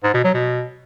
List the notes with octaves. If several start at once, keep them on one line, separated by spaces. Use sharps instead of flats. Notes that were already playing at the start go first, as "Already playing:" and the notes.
G#2
B2
F#3
B2